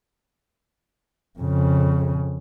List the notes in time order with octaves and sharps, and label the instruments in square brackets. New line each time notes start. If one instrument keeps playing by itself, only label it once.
[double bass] F2 C#3